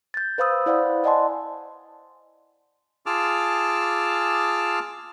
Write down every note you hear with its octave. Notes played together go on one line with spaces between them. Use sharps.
G6 A6
B4 C5 F5 B5 D#6 E6
E4 C5 D5 F5 F#5 B5
D5 D#5 F#5 G#5 A5 C6
F4 G#4 A5 D6 E6 F6